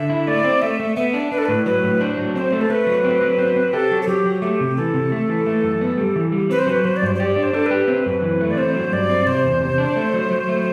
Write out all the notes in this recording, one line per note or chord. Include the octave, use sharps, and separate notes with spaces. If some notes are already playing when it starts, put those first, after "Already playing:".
Already playing: D3 E5
E4
A3 D5
C4
A3 E5
A3
B3 E5
D4
D4 B4
A4
A2 B4
F#3 B4
A2
D4 C5
F#3
C4 C5
A3
A4
A3 B4
F#3
C4
F#3
C4
C4
G4 A4
F#3
A4
F#3 G4
F#3
A3 G4
C3
E3 A4
C3
A3
E3
A3
F#2
B3
G3
E3
G3
C4 B4
C5
F#3 B4
F#3 C5
D5
G2 C5
C5
G4 D5
D4
C5
D4 A4
G4 B4
C4
F#2
E3
A3
D5
C4 C5
F#3
G2 D5
C4
C3 C5
E2
C3
D4
A3
F#3
F#3
A3